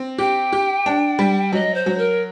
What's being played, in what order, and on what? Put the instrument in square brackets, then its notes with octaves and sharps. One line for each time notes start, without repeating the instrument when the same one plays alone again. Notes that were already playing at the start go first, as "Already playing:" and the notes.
Already playing: [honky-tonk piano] C4
[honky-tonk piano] G4 [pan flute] G5
[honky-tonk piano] G4
D4
G3
[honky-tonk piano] F#3 [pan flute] D#5
[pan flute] C5
[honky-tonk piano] F#3
[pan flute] A#4